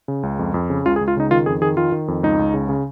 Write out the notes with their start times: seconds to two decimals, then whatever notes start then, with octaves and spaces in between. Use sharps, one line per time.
0.08 C#3
0.23 C#2
0.39 F2
0.54 F2
0.70 C#3
0.86 C#2 F4
0.96 G#4
1.01 C#2
1.08 F4
1.17 C#3 D#4
1.31 D#3 F4
1.46 F2 G#4
1.61 D#3 G#4
1.77 D#3 F4
1.92 D#3
2.08 F2
2.23 C#2 D#4
2.39 C#2
2.54 C#3
2.69 C#3